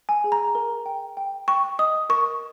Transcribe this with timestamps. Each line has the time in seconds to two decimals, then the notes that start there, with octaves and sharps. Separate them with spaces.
0.09 G#5
0.24 G#4
0.32 A#5
0.55 A#4
0.86 G5
1.17 G5
1.48 G5 C#6
1.79 D#5 D#6
2.09 A#4 C#6